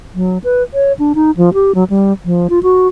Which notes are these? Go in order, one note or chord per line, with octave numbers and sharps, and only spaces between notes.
F#3
B4
C#5
D4
D#4
F3
G4
F#3
G3
F3
F4
F#4